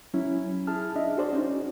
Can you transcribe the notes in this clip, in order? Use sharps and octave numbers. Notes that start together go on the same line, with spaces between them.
F#3 C#4 E4
E4 G#4 A5 F6
D4 D#5 E5
F#4 G#4 C5 D5
C#4 D#4 F#4